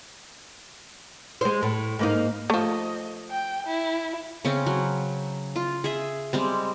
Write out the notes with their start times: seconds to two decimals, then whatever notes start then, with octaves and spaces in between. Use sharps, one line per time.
1.41 G#3 C5
1.63 A2
1.99 G#2 A#3 D#4
2.50 F3 A3 D#5
3.30 G5
3.67 E4
4.45 C#3 C4 C#4
4.66 F#3
5.56 F4
5.84 G#4 E5
6.33 G3 G#3 C4